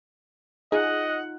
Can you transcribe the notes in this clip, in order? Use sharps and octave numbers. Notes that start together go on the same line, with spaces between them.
D#4 F4 G#4 D#5 F#5